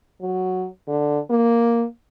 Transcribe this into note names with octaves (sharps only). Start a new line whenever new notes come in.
F#3
D3
A#3